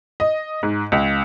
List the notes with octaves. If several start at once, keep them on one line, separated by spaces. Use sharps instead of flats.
D#5
G#2
C#2